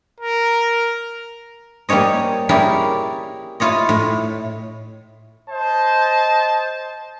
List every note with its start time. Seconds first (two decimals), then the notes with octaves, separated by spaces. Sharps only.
0.20 A#4
1.89 G3 A#3 C#4 C#5 D#5
2.49 C#4 E4 G4 G#4 A#4 D5
3.60 E4 F4 C#5 D#5
3.89 A2
5.50 C5 D#5 A5